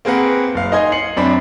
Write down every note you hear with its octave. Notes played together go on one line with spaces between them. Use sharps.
A#3 C4 G#4 A#4 B4 F#5
F#1 F5
D#4 D#5 G#5 C6 G#6
C7 C#7 F#7
F#2 C4 D4 B5 B6